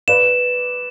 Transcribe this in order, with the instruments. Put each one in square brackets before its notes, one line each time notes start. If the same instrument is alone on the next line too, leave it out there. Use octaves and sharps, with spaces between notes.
[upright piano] B4 D5 [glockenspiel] E7